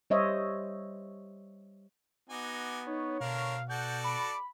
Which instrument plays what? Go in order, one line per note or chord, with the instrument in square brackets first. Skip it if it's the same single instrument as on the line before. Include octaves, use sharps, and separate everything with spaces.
[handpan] G3 C5 C#5 D#5 E5
[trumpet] B3 [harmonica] D#4 F#4 G#5 [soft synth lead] D6
[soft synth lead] D#4 [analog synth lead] C#5
[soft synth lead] B2 [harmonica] D3 D4 A#4 [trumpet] F5
[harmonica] F#4 A4 D5 [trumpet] F#5 [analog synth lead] G6
[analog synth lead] B5 [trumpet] D6